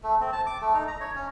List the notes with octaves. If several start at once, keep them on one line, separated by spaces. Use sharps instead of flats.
A3
C4
A5
D6
A3
D#4
A#5
C#5
C#4